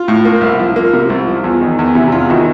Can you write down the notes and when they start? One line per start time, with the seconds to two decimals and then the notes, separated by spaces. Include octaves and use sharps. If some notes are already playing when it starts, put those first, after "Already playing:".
Already playing: F4
0.08 A2
0.25 A#3
0.41 C2
0.59 F3
0.76 A#3
0.93 C3
1.10 C2
1.27 F3
1.44 E2
1.61 D#3
1.79 E2
1.95 C3 E4
2.12 E2 F4
2.29 D#3 E4 F#4